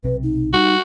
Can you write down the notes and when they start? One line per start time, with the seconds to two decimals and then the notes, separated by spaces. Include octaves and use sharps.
0.04 B1 C3 B4
0.23 D#4
0.53 G3 D#4 F#4